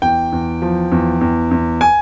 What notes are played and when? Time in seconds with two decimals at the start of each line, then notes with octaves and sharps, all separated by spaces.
0.02 E2 G5
0.32 E2
0.62 F3
0.92 E2
1.21 E2
1.51 E2
1.81 G#5